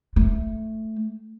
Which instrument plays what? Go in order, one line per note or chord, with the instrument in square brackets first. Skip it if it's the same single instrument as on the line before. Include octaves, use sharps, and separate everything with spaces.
[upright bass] A3